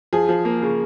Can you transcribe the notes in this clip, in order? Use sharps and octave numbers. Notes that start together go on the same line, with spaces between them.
F3 G#4
F3
A#3
C#3